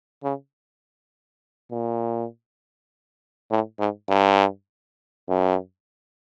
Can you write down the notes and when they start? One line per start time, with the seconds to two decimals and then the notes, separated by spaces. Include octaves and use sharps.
0.24 C#3
1.71 A#2
3.51 A2
3.79 G#2
4.09 G2
5.28 F#2